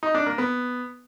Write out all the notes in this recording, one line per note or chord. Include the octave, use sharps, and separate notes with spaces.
D#4
D4
A#3
B3